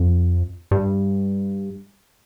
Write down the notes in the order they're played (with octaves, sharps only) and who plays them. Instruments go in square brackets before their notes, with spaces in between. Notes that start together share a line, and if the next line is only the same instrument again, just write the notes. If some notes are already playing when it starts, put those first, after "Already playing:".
Already playing: [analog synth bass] F2
G2